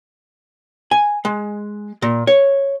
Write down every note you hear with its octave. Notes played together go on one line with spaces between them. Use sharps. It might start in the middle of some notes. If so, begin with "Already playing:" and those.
G#5
G#3
A#2
C#5